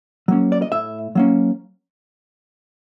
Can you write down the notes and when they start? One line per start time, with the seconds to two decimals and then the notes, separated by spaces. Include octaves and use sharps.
0.28 F#3 A#3 C#4
0.52 D5
0.62 D#5
0.72 A2 E5
1.15 F#3 A#3 C#4